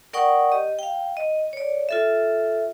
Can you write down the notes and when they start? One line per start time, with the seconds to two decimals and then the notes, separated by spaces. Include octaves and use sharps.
0.13 A#4 D5 F#5 G5 C#6 D#6
0.52 G4 D#5
0.79 F5 G5
1.17 D#5
1.53 C#5 D5
1.89 F4 A4 E5